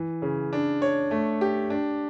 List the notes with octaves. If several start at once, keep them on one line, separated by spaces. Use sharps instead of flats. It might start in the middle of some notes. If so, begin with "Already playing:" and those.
Already playing: E3
C#3
D4
C#5
A3
G4
D4